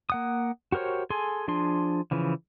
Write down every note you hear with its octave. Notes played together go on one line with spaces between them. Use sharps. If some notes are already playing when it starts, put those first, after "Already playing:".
A#3 F#5 D#6
F#4 G4 A#4 C5 C#5
G#4 A4 G#5 C6
F3 D4 G#4 C6
C#3 E3 F3